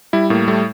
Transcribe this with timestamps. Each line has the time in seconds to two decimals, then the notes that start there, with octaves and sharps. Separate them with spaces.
0.13 G3 E4
0.30 A2 A#3
0.48 G3 A3